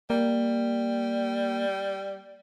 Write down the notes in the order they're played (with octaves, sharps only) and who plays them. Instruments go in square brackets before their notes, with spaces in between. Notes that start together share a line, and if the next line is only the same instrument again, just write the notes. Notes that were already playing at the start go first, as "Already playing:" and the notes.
[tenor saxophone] G3 [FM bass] A#3